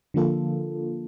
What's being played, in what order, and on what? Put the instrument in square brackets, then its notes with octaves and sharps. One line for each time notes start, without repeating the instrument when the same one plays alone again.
[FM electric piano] D3 F3 A#3 F4 A4